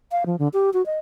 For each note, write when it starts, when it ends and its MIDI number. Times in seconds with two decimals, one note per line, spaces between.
0.12 0.24 77
0.26 0.36 53
0.39 0.48 50
0.53 0.70 67
0.74 0.85 66
0.86 0.99 75